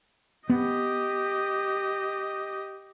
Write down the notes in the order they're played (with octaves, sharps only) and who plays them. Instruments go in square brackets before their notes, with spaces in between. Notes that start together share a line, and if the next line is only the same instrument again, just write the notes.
[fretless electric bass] B3 [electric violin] G4 D#5